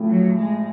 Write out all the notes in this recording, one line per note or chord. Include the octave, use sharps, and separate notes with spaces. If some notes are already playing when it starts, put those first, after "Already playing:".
Already playing: A1 A2 F3 A3
F#3
G#3